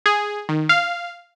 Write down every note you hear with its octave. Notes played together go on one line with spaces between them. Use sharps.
G#4
D#3
F5